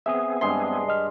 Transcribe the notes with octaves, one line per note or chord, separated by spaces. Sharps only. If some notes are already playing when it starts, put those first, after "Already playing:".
B3 C4 G#4 E5 G#5 D#6
G2 G#3 C6
D#5 F6